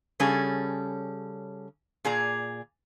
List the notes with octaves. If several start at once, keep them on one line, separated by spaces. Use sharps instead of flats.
C#3 G3 C#4 G#4 A4
A#2 G#4 D5 A#5